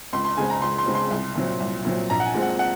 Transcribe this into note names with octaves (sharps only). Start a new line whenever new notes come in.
C#2 C6
C6
C#3 G#3 C4 G#5
A#5
C#2 C6
C6
C#3 G#3 C4
C6
C2
A#2 F#3 C4
C2
A#2 F#3 C4
A#1 A#5
F#5
G#5
A#2 G#3 C4
F#5
F#5